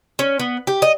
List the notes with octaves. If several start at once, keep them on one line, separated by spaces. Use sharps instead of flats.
C#4
B3
G4
D#5